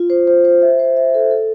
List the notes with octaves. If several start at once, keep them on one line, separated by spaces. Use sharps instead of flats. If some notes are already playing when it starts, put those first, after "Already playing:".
Already playing: F4
C5
C5
C5
E5
C5
E5
A4
A4